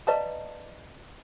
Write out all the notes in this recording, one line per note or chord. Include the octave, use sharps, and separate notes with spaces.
B4 D5 D#5 F5 A5 A#5